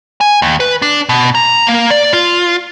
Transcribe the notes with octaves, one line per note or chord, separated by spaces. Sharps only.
G#5
D#2
B4
D4
B2
A#5
A#3
D5
F4